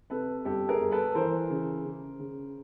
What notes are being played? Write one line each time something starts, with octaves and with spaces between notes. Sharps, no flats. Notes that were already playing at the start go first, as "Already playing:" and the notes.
C3 A4 B4
G1 G4 A4
G#4 A#4
G1
A4 B4
E3 A#4 C5
C#3
C#3
C#3